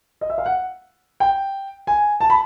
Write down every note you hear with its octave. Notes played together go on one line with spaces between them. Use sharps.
D#5
E5
F5
F#5
G5
G#5
A5
B5